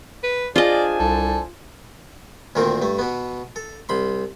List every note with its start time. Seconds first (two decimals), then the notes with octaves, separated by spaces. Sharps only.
0.23 B4
0.56 D4 F4 G#4 C5 D5 D#5 G#5
1.00 C2 A4
2.55 D2 A#2 D#3 C4 A#4
2.82 G2 A3
2.99 B2 B3
3.56 A4
3.89 C2 B5 C6